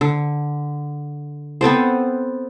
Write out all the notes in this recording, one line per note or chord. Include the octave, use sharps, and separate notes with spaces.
D3
B3 C4 A4 C5